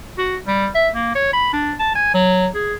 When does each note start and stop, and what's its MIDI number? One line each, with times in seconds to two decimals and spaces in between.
0.18 0.37 66
0.47 0.68 55
0.75 0.89 76
0.95 1.12 58
1.15 1.32 73
1.33 1.50 83
1.53 1.74 62
1.79 1.95 81
1.95 2.10 80
2.14 2.47 54
2.55 2.74 68